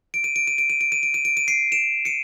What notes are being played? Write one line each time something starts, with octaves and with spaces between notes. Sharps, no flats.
D7
D#7
D7
D#7
D7
D#7
D7
D#7
D7
D#7
D7
D#7
C7 D7
D7 E7
C#7 D#7